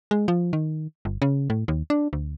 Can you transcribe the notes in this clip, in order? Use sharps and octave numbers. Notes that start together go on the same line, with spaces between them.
G#3
F3
D#3
G1
C#3
A2
D#2
D4
D2